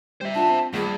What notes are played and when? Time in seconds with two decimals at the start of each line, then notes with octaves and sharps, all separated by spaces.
0.21 G3 C5 E5
0.34 D4 F4 F#5 A5
0.49 C4
0.73 A#1 G2 G#4